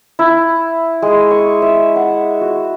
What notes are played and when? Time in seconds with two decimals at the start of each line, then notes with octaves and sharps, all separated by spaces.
0.19 E4
1.02 G#3
1.31 C#6
1.62 E5
1.96 F#5
2.41 F#4